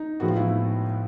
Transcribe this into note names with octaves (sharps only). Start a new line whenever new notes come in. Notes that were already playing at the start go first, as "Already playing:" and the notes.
Already playing: D#4
A2 F3 G#3 B3 F#4
F4
E4